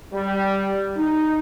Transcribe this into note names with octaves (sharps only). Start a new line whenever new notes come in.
G3
D#4